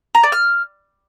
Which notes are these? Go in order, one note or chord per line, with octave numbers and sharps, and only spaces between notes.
A#5
D5
F6